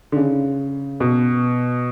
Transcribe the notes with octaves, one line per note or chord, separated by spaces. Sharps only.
D3
C#3
B2